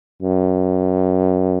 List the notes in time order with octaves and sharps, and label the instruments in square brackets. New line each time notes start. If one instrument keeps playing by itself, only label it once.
[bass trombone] F#2